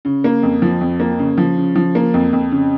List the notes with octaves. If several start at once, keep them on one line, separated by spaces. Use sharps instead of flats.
C#3
A#3
F2
F3
F2
A#3
C#3
F3
C#3
F3
A#3
F2
F2
C#3